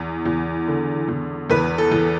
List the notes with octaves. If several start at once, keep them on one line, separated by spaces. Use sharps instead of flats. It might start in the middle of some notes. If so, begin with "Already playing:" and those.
Already playing: E2
E2
D3
E2
E2 B4
A4
E2